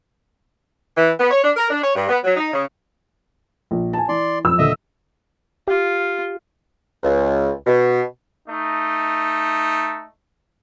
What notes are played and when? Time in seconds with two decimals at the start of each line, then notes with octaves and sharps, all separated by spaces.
0.96 E3
1.18 B3
1.31 C#5
1.44 D4
1.57 A#4
1.70 D4
1.83 C#5
1.96 G2
2.09 B3
2.24 F#3
2.36 D#4
2.53 C#3
3.71 A#1
3.93 G#5 A5
4.09 E3 D5 C6
4.45 F2 E6
4.58 D#1 D3 D#5 E5
5.68 F4 G4
7.04 C#2
7.67 B2
8.49 A3 D#4